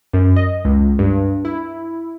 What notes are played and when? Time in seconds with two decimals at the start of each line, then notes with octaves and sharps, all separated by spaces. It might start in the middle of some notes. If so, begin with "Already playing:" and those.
0.13 F#2
0.36 D#5
0.65 C#2
0.99 G2
1.45 E4